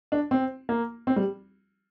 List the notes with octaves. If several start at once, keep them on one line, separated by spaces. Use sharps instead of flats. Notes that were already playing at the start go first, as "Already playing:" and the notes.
D4
C4
A#3
C4
G3